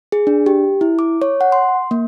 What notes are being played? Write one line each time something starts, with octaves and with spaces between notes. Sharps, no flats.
G#4
D4
G4
E4
D6
C#5
F#5
C6
A#3